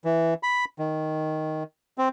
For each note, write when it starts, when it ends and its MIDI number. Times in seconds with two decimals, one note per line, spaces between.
0.05 0.34 52
0.43 0.65 83
0.79 1.63 51
1.98 2.09 60